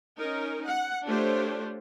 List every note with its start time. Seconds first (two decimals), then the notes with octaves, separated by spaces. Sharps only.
0.18 C#4 D#4 A#4
0.64 F#5
1.05 A3 D4 F4 G4 C5 C#5